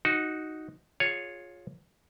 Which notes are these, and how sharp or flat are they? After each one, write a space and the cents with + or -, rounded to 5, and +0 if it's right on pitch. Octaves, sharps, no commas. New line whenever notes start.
D#4 +0 F#4 +0
F4 +20 G#4 +0 C#5 +0